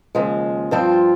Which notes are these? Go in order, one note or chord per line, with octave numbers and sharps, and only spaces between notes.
D#2 C#3 F3 G#3
G2 F3 C4 F4 C5